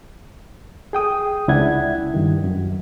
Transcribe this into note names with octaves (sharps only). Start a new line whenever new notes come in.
G#4 G5 D#6
C#2 D4 E4 F#5 G#6
G2 D#3
F#2